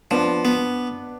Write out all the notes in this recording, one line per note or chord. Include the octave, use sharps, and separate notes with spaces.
F3 B3 D4
B3